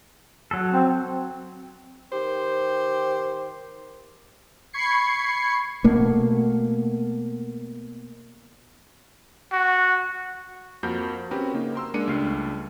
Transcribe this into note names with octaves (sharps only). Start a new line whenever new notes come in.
F#3 A4
C4
D#3 G4 C5
B5 C#6 G#6 C7 C#7
B2 A3 A#3
F#4
F2 A#3 F#4 A#4 G6
C4 C#4 F#4 G4 A#4 B4
C#3 A#3 D#4
A#4 C6 E6
G#3 A#3 D4 C#7 D#7
C#2 G3 A3 D4 F6 C7